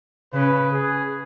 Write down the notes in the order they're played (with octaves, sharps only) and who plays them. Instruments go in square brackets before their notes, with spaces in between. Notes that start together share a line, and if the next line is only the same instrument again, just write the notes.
[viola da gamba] C#3 [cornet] B4
[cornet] G#4